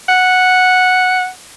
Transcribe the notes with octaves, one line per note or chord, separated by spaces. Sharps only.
F#5